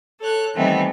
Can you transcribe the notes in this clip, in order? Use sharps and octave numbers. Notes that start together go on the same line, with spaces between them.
A4 C#5 F#6
D#3 E3 G3 A3 B3 C4